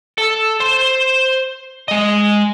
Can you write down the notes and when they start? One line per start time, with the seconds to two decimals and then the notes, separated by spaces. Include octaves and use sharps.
0.18 A4
0.60 C5 C6
1.88 G#3 D#5